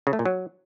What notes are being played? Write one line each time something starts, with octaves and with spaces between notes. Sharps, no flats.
C#3
A3
A#2
F#3